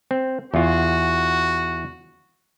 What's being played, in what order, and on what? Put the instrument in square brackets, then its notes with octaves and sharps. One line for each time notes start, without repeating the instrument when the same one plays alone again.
[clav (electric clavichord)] C4
[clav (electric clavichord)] E2 F4 [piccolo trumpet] F#4